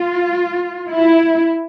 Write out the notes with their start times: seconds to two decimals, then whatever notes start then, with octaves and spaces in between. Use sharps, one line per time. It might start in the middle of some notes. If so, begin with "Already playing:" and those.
Already playing: F4
0.90 E4